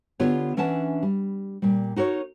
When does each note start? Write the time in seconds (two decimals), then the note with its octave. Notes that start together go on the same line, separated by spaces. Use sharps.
0.20 D3 B3 F4 G4 C#5
0.57 E3 C#4 D4 E5 F#5 A5
1.03 G3
1.62 A#2 G3
1.96 D#4 F#4 A#4 C#5